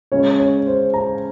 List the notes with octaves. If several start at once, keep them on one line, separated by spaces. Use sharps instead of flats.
C#3 G#3 C#4 C#5
C#5
C5
A#5